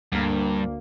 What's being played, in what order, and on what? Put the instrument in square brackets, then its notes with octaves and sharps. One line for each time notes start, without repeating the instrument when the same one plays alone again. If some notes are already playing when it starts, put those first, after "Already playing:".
[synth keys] D2 A#3 [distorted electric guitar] G2